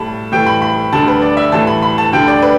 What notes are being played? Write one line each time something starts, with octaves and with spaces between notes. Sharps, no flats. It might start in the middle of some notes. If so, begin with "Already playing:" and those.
Already playing: A2 G3 A5 B5
A2 E3 G3 G5
B5
B5
D2 D3 G3 A5
B4
D5
E5
A2 E3 G3 A5
B5
B5
A5
D2 D3 G3 G5
D5
B4